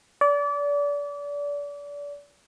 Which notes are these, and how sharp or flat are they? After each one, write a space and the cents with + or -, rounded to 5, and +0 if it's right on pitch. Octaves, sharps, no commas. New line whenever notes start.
D5 -30